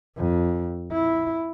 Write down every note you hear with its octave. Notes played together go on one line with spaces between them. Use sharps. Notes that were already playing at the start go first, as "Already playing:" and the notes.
F2
E4